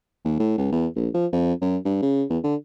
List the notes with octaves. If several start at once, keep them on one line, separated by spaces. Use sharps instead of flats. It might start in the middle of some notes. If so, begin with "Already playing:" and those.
D#2
A2
C#2
E2
A#1
F3
F2
F#2
G2
C#3
E2
D3